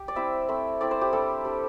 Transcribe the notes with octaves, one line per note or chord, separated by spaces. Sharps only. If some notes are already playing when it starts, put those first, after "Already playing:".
Already playing: G4
D5
G3 C4 E4 E5
A3 C4 E4
A3 C4 E4 D5
C5
G4
G3 D4 A4
G3 D4